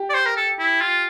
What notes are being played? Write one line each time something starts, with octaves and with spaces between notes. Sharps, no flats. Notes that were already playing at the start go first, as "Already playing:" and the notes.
Already playing: G4
D5
C5
A#4
A4
E4
F4